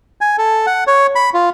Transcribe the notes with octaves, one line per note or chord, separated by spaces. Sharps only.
G#5
A4
F#5
C#5
B5
F4